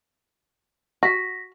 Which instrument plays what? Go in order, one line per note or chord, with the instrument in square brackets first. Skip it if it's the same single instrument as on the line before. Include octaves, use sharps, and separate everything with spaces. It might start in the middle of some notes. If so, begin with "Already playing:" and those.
[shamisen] F#4 [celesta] A#6 B6